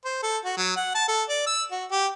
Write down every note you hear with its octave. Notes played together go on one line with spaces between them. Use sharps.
C5
A4
F#4
F#3
F#5
A5
A4
D5
E6
F#4
G4